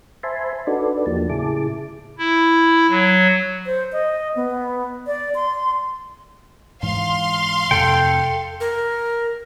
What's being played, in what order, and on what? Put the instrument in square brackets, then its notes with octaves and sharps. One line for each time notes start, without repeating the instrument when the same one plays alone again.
[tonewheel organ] C5 E5 G#5 A5 B5 C6
D4 D#4 F#4 A4 B4 D5
E2 F3 A#3 G4 A5
A2 C#3 E4 G#4 A5 D6
[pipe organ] E4
F#3
[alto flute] C5
D#5
B3
D5
C6
[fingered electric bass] G#2 E3 [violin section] F5 C6
[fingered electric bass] F2 C3 [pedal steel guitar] A4 G5
[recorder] A#4